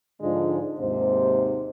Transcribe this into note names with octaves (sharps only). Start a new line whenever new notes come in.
G#2 D3 F3 G#3 D4 F4
D#2 G#2 C3 C5